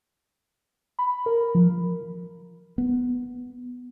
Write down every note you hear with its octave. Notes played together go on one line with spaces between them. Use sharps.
B5
A#4
F3
B3